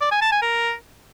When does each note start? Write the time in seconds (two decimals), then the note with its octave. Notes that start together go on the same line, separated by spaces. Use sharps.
0.01 D5
0.11 G#5
0.22 A5
0.32 G#5
0.42 A#4